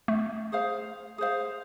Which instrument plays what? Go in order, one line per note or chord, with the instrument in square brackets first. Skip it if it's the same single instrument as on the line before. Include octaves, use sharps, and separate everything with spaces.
[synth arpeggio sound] A3
[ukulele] G#4 C5 F5
G#4 C5 F5